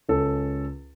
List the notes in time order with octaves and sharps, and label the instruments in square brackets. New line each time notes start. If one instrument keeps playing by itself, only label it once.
[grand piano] C#2 C#4 A4